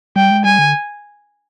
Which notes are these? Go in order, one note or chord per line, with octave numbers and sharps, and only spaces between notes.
G3 G5
G#3
G3 G#5
D3